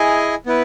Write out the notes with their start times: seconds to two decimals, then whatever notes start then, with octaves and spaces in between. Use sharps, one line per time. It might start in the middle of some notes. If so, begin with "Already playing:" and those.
Already playing: E4 G#4 D#5 G#5
0.46 B3 E4 B4